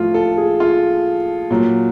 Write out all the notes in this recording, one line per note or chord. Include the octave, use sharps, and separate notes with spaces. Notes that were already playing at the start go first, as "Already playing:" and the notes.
Already playing: A2 F3 F4
A4
G#4
F4
A#2 F#3